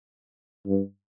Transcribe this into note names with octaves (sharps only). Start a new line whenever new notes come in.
G2